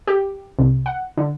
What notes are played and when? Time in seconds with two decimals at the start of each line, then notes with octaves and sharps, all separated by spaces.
0.07 G4
0.59 C2
0.86 F#5
1.17 D3